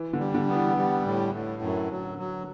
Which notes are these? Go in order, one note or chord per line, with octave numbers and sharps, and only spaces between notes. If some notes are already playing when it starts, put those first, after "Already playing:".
Already playing: E3
D3
G3
D3
B3
E3
G3
A2
A2
F#2
F#3
F#3